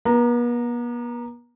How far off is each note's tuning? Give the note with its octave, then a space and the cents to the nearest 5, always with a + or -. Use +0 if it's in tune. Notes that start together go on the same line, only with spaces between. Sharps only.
B3 -45 A#5 +0